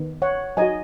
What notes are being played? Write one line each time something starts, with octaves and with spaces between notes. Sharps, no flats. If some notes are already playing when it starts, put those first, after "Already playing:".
Already playing: D#3 B3 D#4
C#5 F#5
F#3 D#4 F#4 D#5 G#5